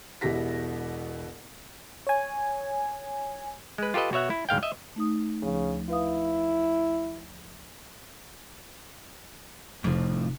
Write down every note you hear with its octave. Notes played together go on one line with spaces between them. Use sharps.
E1 B2 E4 G4 A#6 B6
C#5 G#5
G#3 B4
F4 G4 A4 B4 D#5
B2 F#4 C#5 E5 F#5
E4
D2 G#2 F5 G5
D#5 E5
A3 D#4 D#6
D2 C#3 F3
E4 B4 F5 D#6
F1 F2 A2 F3